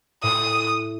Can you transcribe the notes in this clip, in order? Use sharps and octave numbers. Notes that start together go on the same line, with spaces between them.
A2 D#6